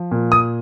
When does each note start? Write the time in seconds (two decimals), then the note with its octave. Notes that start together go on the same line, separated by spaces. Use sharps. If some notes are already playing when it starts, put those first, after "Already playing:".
Already playing: F3
0.11 A#2
0.32 D#6